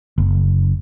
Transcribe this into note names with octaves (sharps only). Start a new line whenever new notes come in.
F#1